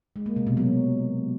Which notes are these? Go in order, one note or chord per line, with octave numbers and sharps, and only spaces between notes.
G#3
A#3
C3
B2
F#3